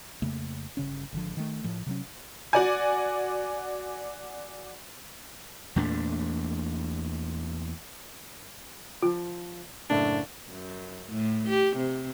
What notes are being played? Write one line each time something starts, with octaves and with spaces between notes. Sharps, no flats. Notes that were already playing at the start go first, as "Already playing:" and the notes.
F2 C#3 A3 A#3
G1 C#3 C#4
G#1 D3 F3
D#3 A3
A2 F3
C3 F#3 C#4
F#4 D5 G#5
E2 A#2 A3 D4
F3 F4
F#1 A2 D4 E5
F#2
A2
G4
C3